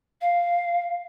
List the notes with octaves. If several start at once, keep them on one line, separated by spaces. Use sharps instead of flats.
F5